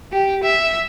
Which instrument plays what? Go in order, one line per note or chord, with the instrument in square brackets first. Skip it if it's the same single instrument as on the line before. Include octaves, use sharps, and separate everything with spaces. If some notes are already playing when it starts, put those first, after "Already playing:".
[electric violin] G4
E5